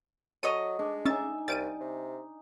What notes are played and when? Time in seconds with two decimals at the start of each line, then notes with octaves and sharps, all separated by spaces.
0.43 F#3 A4 C#5 D#5 D#7
0.79 G#3 D4
1.05 C#4 D#4 E5 G#5 A6
1.48 C2 G3 A6 D7 D#7
1.81 C3